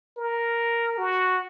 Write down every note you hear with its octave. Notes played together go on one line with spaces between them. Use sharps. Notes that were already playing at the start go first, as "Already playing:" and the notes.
A#4
F#4